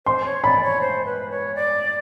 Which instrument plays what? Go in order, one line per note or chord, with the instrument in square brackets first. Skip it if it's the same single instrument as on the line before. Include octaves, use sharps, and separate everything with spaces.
[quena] C5 [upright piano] C6
[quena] C#5
[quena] D5 [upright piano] B5
[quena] C#5
C5
B4
C#5
D5